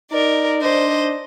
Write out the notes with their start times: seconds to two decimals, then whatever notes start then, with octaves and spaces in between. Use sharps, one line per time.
0.12 D#4 A#4 D5
0.61 D4 C5 D#5